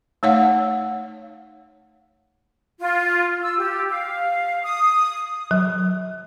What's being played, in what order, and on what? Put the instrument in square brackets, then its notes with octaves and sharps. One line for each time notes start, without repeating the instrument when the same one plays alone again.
[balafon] A3 D#4 C#5 F5 F#5
[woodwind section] F4
E6
G4
F5
D#6
[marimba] F#3